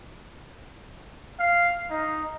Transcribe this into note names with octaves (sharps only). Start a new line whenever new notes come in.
F5
D#4